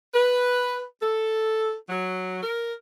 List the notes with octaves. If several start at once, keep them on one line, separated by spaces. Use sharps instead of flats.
B4
A4
F#3
A#4